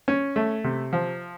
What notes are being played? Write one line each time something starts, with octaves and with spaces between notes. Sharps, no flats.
C#4
A3
C3
F3